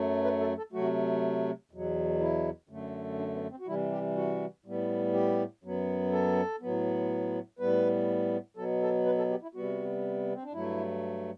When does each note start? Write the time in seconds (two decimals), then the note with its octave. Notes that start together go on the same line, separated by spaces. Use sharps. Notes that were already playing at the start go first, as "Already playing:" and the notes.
Already playing: F#2 F#3 A3
0.24 B4
0.40 A4
0.57 A4
0.73 C3 F#3 A3 F#4
1.71 E2 B2 F#3
2.20 E4
2.69 F#2 D3 A3
3.19 D4
3.34 B3
3.51 C4
3.60 F#4
3.67 C3 E3 G3 E4
3.92 G4
4.16 F#4
4.66 A2 G3 B3
5.14 G4
5.63 F#2 F#3 B3
6.12 A4
6.61 A2 F#3 B3
7.59 A2 G3 B3 B4
8.57 B2 F#3 B3 A4
8.82 A4
9.06 B4
9.18 A4
9.30 G4
9.42 E4
9.55 C3 G3 B3 F#4
10.34 C4
10.43 D4
10.53 G2 F#3 A3 E4